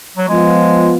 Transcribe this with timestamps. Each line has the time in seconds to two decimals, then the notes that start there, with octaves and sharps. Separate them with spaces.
0.18 F#3
0.29 F3 G#3 B3 F4